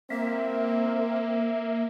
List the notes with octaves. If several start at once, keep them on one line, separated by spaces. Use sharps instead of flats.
A#3 C4 A#4 E5